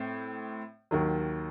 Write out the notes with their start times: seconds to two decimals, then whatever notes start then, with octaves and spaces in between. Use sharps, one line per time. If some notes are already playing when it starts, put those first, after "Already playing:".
Already playing: A2 C4
0.91 D#2 D#3 F#3